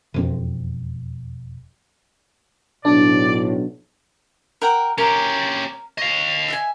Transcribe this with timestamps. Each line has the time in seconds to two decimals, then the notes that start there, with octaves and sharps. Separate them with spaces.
0.14 E1 F2 C4
2.85 B1 A2 D4 D5
4.62 A#4 F#5 G5
4.98 C#4 G4 A#4
5.98 C#5 D#5 F5
6.48 E5 F#5 G#5